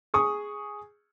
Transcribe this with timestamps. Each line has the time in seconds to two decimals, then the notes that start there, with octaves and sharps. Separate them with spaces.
0.14 G#4 C#6 D#6